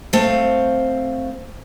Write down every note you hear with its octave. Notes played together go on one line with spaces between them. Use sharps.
A3 C4 C5 F5